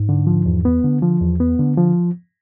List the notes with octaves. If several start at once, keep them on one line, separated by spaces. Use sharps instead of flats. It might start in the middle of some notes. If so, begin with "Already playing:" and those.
Already playing: G#2
D3
F3
E2
B3
D3
F3
E2
B3
D3
F3